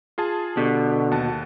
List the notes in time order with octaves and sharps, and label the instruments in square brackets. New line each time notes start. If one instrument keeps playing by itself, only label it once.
[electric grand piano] F4 G#4 A5
[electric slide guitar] B2 [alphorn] D3 [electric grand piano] G4
[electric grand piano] D#2 F#5 A5